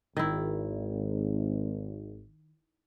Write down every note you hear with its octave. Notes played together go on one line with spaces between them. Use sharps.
G#1 D#3 E4